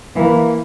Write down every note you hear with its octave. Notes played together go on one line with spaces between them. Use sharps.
E3 A#3